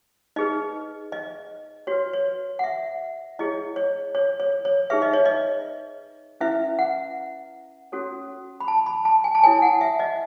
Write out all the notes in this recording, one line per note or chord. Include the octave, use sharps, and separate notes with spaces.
D#4 G#4 B4 D#5
D#5
F#4 B4 C#5
C#5
F#5
E5
E4 G#4 C#5 D#5
C#5
C#5
C#5
C#5
D#4 G#4 B4 E5
D#5
C#5
D#5
C#4 E4 B4 E5
F#5
C#4 F#4 A4 C#5
B5
A5
B5
A5
G#5
A5
E4 A4 C#5 G#5
F#5
E5
D#5